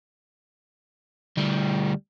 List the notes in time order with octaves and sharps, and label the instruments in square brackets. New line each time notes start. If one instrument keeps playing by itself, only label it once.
[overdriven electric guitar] D2 G3